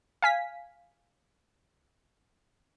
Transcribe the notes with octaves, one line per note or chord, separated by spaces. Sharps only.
F5 G#5 B6